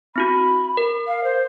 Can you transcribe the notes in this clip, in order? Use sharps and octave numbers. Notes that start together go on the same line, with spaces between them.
C4 E4 F#4 B5
A#4
F5
C5